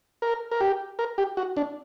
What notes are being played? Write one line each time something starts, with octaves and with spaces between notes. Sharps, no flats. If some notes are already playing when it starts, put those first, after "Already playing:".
A#4
A#4
G4
A#4
G4
F#4
D4